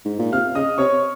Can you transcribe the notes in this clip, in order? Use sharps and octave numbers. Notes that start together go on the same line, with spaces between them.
G#2
A#2
C3 F5 F6
C#3 D#5 D#6
C3 C#5 C#6